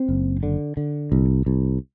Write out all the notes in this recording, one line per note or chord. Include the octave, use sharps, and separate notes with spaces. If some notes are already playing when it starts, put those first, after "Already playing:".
Already playing: C4
F#1
D3
D3
C2
C2